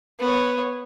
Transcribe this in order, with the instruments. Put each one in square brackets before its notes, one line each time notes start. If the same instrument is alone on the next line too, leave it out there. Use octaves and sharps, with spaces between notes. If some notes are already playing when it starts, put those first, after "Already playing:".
[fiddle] B3 C#5